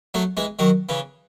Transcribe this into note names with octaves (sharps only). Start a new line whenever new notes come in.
F#3 A3
E3 G#3
D#3 F#3
C#3 E3